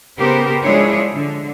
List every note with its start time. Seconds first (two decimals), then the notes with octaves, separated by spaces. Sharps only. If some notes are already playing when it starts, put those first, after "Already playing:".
0.19 C#3 B3 G4 A#4 C5
0.64 F3 G#3 D4 E4 G#4 C#5
1.14 D3